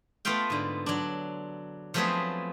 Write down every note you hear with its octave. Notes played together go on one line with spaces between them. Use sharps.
A3 B3 F4 B4 F5 G5
G#2 D3
F#3 D4
F3 F#3 A3 B3 C4 G#4